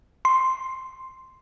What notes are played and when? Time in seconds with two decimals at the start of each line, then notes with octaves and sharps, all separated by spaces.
0.25 C6